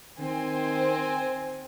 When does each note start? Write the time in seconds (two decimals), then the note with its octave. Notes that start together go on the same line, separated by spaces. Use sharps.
0.19 D#3 C4 G#5